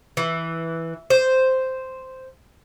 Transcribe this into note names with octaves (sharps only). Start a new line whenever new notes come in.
E3
C5